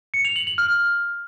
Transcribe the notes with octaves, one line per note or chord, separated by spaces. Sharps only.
C#7
F7
F#7
F#7
F6